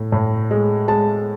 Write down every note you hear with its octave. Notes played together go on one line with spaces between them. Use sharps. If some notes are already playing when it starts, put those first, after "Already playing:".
Already playing: A2
A2
G#3
G#3 A5